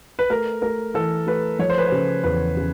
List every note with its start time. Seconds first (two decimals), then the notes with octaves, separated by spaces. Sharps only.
0.19 B4
0.30 A3 A#4
0.62 A3 A#4
0.94 E3 A4
1.27 A3 B4
1.59 F3 C#5
1.70 C5
1.78 B4
1.88 C#3 C5
2.24 E2 B4
2.57 C#3